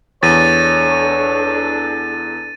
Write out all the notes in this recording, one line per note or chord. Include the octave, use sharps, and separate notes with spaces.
E2 D4 A4 C#5 A6 D#7